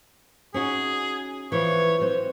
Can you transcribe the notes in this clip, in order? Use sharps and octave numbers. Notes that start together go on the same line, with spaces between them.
C#4 D#4 F#4 G#4
E3 F3 B3 C#5
F#3 C4 C5